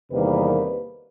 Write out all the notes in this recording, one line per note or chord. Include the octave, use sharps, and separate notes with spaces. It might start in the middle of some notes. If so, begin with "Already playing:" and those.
E2 C3 D#3 G3 A#3 B4